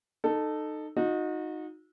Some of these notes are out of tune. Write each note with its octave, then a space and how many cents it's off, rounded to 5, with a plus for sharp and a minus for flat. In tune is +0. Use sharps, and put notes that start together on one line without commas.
D#4 -20 A4 +0
D#4 +0 F#4 -35